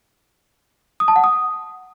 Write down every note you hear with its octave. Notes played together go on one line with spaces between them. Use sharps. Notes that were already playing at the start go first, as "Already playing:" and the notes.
D#6
A5
F#5
D#6